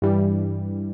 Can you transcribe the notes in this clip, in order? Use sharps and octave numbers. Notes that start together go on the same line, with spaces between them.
G2 E3 G3